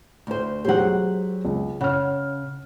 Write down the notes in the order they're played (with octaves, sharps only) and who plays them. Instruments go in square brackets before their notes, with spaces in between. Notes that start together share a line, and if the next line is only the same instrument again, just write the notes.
[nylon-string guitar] D2 C5
[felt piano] F#3 G#3 G4 [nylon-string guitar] C5 F#5
[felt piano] C#2
[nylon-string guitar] C#3 [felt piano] F#5 F6